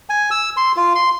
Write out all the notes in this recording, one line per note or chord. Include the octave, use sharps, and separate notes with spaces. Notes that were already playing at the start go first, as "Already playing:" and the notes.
G#5
E6
C6
F4
C6